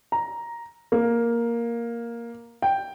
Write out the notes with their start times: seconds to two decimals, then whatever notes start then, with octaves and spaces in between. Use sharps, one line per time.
0.12 A#5
0.92 A#3
2.62 G5